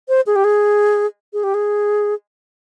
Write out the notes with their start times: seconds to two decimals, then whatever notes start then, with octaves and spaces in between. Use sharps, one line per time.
0.08 C5
0.26 G#4
0.36 G4
0.44 G#4
1.33 G#4
1.43 G4
1.54 G#4